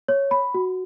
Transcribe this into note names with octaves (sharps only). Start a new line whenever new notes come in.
C#5
B5
F#4